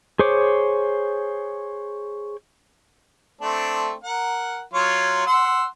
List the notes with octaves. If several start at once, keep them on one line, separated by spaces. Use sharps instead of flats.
G#4 C5 C#5 D6
A3 C4 D4
A#4 F#5
F#3 F4 C#5
F#5 C6 E6